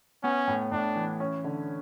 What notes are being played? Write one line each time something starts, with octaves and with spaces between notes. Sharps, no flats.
B3 C#4
A2
A2 D4
E3
C#4
D3